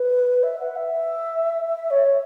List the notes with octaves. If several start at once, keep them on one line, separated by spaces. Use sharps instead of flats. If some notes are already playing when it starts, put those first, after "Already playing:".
Already playing: B4
E5
F#5
E5
C#5